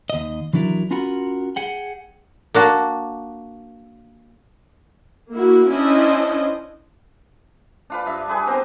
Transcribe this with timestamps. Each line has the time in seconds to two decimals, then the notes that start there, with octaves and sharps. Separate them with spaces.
0.10 D#2 D#5
0.53 E3 F#3 D4 E4 A#4
0.91 C#4 F4 F#4 A#4 F#5 B5
1.56 G#4 F#5 G5
2.55 A#3 D4 F#4
5.32 A#3 E4 F#4
5.70 C#4 D4 E4 C5 D#5
7.90 D4 F4 B4
8.06 G2 E5
8.28 G3 G#4 B4 D6
8.47 B3 C4 A#4 C5